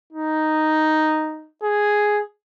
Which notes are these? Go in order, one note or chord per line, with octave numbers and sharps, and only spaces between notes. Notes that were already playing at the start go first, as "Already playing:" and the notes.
D#4
G#4